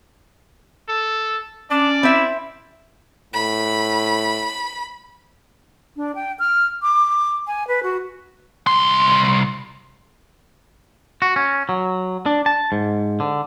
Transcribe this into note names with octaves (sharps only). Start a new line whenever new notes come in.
A4
C#4 D4 D5
C4 E4 E5
A2 B5
D4
G5
F6
D6
G#5
B4
F#4
C2 C6
F#4
C#4
F#3
D4
A5
G#2
D3